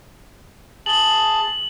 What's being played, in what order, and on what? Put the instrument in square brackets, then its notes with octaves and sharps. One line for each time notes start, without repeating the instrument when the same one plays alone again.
[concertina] G#4 A5 [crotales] F#7 G7